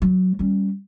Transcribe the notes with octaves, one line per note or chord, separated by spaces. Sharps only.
F#3
G3 C#4